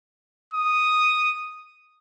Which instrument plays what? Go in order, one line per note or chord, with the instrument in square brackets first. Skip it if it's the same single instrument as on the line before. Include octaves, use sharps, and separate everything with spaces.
[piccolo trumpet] D#6